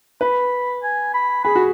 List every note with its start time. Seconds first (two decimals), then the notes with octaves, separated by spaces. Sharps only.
0.21 B4 B5
0.83 G#5
1.14 B5
1.44 G#4 B5
1.55 F#4